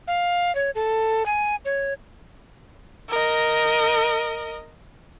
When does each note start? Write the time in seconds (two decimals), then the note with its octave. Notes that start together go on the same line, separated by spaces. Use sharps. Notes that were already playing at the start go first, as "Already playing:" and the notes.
0.07 F5
0.55 C#5
0.75 A4
1.26 G#5
1.65 C#5
3.09 A#4 D#5